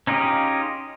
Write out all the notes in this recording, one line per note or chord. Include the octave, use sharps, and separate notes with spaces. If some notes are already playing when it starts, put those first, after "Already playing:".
C#4 D#4 F4 G4 G#4